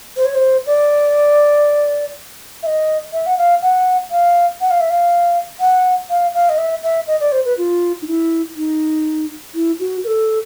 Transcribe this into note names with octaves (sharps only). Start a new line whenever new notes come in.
C5
C#5
C5
D5
E5
D#5
E5
F#5
F5
F#5
F5
F#5
F5
E5
F5
F#5
F5
F5
D#5
E5
E5
D#5
D5
C5
B4
F4
D#4
E4
D#4
E4
F#4
A#4
A4